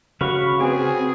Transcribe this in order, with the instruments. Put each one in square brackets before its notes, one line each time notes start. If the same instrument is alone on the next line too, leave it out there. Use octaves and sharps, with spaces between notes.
[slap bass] C#3 [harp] F#4 [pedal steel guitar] F5 B5 C#6
[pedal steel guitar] C4 [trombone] G#4 [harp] B4 G#5